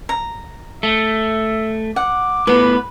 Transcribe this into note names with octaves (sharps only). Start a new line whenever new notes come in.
A#5
A3 E5
F#5 D6
A2 B3 B4